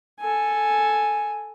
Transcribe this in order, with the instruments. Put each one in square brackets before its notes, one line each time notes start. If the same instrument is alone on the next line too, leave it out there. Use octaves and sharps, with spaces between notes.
[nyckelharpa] A4 G#5